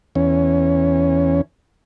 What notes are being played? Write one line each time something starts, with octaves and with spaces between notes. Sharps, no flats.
E2 C#4